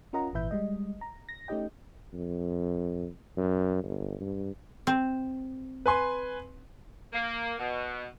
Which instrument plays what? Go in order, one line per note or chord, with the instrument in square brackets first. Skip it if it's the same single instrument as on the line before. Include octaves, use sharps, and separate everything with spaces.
[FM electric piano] C#4 F4 A#4 D#5 F#5 A#5
G#1 A#2 E3 B4 E5 G6
G3 G#3 D#5
A#5
A#6
A3 C#4 D#4 G4 D#5 G5
[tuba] F2
F#2
G1
G2
[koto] C4
[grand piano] B4 G#5 C6
[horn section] A#3
B2